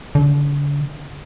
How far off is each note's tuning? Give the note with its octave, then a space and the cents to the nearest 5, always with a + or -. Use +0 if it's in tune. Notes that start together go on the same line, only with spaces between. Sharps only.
D3 -40